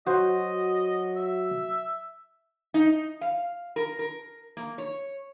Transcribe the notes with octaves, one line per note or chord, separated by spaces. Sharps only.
F#3 F#4 C5 D#5
E5
D#4
F5
A#4
A#4
A#3
C#5